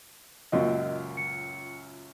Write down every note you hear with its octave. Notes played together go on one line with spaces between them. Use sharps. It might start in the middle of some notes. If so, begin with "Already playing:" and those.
C#2 F#2 A#2 D#5
C#7